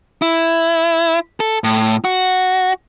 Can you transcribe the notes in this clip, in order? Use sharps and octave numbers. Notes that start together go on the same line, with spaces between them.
E4
A4
A2
F#4